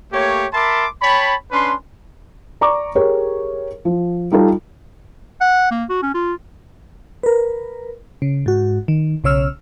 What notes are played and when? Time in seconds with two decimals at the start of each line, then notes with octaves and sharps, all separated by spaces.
0.12 A3 A#3 G4 C#5
0.53 A#4 E5 A5 B5 C6 D6
1.01 C#5 G5 A5 B5
1.52 C#4 D4 B4 C6
2.61 D5 A#5 C#6 D6
2.95 G4 G#4 A#4 C#5
3.85 F3
4.32 G3 D#4 F4 A4
5.41 F#5
5.71 A#3
5.89 F#4
6.02 C#4
6.14 F4
7.23 A#4 B4
8.22 C#3
8.46 G#2 F#4
8.88 D#3
9.24 B1 C#3 C#5 E6 F6